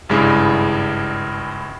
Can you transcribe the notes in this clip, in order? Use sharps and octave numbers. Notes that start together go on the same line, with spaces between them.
G#1 G2 C#3 G#3 E4